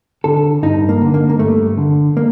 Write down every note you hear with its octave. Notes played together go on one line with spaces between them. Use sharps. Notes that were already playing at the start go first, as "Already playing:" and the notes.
D3 A4
G2 D#4
A#3
D3
A#3
A#3
G2 A3
D3
A#3